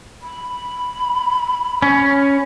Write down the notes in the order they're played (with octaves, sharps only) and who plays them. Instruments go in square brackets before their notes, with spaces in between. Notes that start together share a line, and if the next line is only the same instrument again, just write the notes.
[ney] B5
[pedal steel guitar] C#4